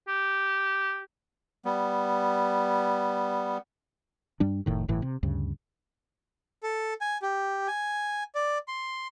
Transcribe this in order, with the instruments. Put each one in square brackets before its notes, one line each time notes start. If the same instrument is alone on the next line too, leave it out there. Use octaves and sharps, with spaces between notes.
[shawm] G4
[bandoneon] G3 B3
[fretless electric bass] G2 G3 D4
F1 A2 D#3
G1 A2 E3
C3
D2 G2 C#3
[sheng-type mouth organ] A4
G#5
G4
G#5
D5
C6